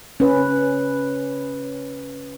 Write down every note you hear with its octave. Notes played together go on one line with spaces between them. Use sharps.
C#4 B4